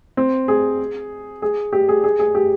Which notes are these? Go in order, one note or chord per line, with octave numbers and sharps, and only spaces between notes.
C4
G#4
G#4
G4
G#4
G#4
G#4
G4